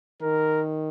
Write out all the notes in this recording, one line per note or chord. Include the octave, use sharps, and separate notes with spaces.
D#3 A#4